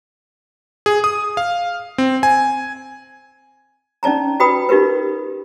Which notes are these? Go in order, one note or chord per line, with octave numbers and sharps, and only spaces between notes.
G#4
D#6
F5
C4
G#5
C#4 D#4 D5 A5 A#5
F#4 B4 G5 B5 D#6
D#4 F4 G4 A#4 B4